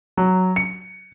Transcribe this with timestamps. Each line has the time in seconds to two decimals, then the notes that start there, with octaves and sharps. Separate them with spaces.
0.17 F#3
0.56 C#7